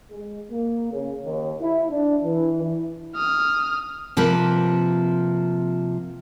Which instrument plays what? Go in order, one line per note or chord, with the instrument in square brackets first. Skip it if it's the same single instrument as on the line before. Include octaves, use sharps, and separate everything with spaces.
[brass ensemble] G#3
A#3
C#3
D#2
E4
D4
E3
E4
[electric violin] D#6 F6
[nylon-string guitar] C3 F3 A#3 B4